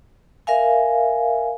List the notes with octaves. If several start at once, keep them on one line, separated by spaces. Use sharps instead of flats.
A#4 E5 F5 G#5